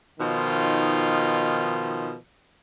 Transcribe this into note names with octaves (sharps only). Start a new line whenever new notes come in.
B2 D#3 F3 D#4 F4